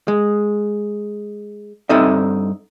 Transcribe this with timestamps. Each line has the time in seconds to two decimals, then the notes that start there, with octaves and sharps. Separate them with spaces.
0.08 G#3
1.89 G2 C4 D#4 A4 D#5 E5